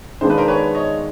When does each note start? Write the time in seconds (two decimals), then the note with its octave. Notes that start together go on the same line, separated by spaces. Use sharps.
0.21 D#3 G#3 B3 D4 F4 C5
0.30 B4
0.38 A#4 C5
0.48 B4 C#5
0.75 C#5 D#5